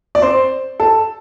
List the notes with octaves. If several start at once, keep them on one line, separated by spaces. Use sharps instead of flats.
D5
C4 C5
A4